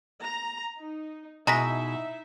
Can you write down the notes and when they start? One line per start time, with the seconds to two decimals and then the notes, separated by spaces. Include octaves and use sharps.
0.23 A#5
0.79 D#4
1.47 B2 G#3 D#4 E4 E5 A#5 A#6 B6